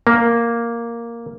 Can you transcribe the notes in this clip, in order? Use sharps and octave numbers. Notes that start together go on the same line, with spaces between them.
A#3